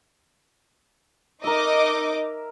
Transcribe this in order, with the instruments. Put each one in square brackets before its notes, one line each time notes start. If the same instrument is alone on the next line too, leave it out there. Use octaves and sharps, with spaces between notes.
[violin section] D#4 D#5 D6 [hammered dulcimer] A#4 E5